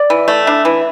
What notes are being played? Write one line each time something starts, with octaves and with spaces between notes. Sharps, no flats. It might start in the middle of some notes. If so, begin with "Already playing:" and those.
Already playing: D5
E3
A3
D4
E3